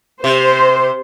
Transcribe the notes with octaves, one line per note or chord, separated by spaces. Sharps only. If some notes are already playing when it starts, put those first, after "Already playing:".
C3 C5